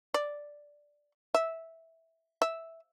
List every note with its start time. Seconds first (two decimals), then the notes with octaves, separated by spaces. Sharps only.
0.14 D5
1.34 E5
2.42 E5